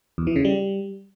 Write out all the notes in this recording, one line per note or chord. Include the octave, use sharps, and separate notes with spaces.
E2
E3
C#3
G3